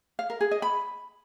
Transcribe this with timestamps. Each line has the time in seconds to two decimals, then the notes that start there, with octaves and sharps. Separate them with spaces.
0.19 F5
0.30 A#4
0.41 G#4
0.51 D#5
0.62 B5